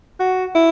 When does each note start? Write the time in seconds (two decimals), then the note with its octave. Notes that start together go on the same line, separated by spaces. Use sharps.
0.20 F#4
0.55 E4